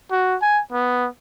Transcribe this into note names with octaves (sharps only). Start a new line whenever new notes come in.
F#4
G#5
B3